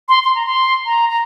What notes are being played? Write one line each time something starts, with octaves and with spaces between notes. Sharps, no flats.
C6
C6
A#5
C6
A#5
A#5